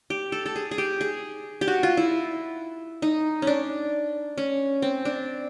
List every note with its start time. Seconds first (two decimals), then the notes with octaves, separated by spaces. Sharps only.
0.10 G4
0.32 A4
0.46 A4
0.56 G#4
0.71 G#4
0.78 G4
1.01 G#4
1.61 G4
1.68 F#4
1.83 F4
1.97 E4
3.02 D#4
3.42 C#4 D4
4.38 C#4
4.82 C4
5.05 D4